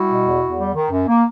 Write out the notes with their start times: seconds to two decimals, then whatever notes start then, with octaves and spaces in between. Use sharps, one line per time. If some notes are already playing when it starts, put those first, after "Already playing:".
Already playing: G3 E4 F#4
0.10 B2
0.26 E2
0.43 E2
0.59 G3
0.75 D#3
0.91 F#2
1.07 A#3